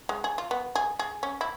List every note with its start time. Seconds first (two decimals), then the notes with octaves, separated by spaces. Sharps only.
0.09 G#3
0.24 G#4
0.38 F4
0.51 B3
0.76 G#4
0.99 G#4
1.23 C#4
1.41 E4